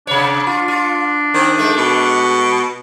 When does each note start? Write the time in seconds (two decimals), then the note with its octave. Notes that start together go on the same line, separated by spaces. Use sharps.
0.07 C3 D4 C#5
0.47 F4
0.68 F4
1.34 D#3 C4
1.58 G#3 A3
1.77 B2